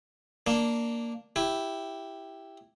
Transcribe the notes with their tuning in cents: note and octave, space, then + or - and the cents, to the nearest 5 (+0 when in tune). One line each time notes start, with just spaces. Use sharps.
A#3 +0 D4 +0
E4 +0 G4 +0